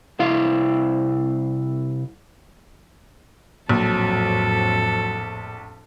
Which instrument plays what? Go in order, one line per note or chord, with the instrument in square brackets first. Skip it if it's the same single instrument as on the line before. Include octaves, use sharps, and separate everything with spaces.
[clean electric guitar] C2 E4 F5
[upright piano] A#1 [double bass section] F2 A2 [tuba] F#3 [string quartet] A4